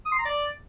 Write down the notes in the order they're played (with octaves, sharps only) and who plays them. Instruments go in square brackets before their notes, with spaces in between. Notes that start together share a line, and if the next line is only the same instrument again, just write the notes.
[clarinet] D#6
C6
A#5
D5